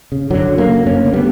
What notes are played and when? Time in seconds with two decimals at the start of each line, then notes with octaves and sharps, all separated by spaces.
0.12 C#3
0.30 F#2 D3 F#3
0.49 F#2
0.58 F#3 A#3
0.67 C#3
0.86 F#2 A#3 C#4
1.05 D3 A#3
1.13 G3 B3